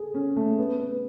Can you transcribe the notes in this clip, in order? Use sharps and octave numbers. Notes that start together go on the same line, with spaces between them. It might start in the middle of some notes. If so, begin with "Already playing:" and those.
Already playing: G#4 A4
C#4
A3
B3
B3